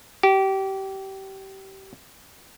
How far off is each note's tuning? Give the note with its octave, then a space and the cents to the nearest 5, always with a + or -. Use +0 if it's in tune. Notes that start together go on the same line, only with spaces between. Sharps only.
G4 -25